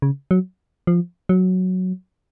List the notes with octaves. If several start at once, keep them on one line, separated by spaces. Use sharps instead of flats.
C#3
F#3
F3
F#3